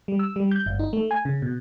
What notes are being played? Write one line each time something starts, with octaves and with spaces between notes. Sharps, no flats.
G3
E6
G3
G6
G1
D#4
A3
G#5
C#3
B2